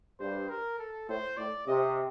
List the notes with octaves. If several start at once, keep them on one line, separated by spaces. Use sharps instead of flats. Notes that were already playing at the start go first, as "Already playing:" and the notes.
G2 C5
A#4
A4
A2 C5
A2 D5
C3 D#5